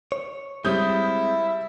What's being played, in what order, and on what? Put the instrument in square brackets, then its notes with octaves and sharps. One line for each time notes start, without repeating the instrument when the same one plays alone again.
[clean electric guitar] C#5
[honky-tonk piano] G3 D#6 G6 [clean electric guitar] G#3 C4 [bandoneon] E4 [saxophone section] E5